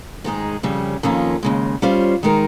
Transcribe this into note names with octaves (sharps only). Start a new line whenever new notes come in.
G#2 D#3 G#3 D#4 G#4
F2 C#3 G3 C#4
F2 D#3 A#3 C#4 F4
D#2 C#3 G#3
G3 C#4 F4 C5
D#3 G#3 D#4 A#4